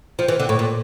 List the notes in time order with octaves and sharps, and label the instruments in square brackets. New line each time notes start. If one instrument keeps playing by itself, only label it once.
[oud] F3
E3
D3
A2
A#2